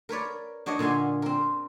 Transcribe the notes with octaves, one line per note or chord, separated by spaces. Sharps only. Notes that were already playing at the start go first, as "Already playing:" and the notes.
A#4 B4 C#5 D5
D4 F#4 C#5 D#5
A#2 D3 F5 G#5 C6
C4 A#4